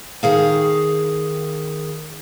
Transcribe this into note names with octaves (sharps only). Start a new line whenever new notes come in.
D#3 G#4 F5